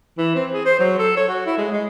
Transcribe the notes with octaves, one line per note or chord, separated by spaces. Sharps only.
E3
C4
G#4
C5
F#3
A4
C#5
F#4
E4
G#3
G#3